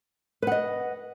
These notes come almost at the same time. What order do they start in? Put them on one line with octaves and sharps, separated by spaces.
B4 F#5 D#5